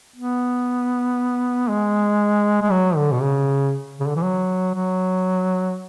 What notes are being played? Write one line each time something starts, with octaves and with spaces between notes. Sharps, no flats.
B3
G#3
G#3
F#3
D3
B2
C#3
C#3
D3
E3
F#3
F#3